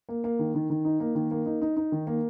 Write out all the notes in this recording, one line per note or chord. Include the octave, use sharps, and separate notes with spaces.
A#3
A#3
D#3
D#3
D#3
D#4
A#3
D#3
A#3
D#4
D#4
D#4
D#3
A#3